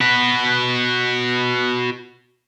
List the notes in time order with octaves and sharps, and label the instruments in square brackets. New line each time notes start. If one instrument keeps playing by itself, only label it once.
[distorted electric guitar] F#4 B4